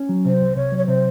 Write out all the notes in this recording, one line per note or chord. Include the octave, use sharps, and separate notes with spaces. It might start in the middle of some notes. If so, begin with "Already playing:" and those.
Already playing: C#4
F#3
C3 C5
C2
C3 C#5
F#3
C#5
C3 C5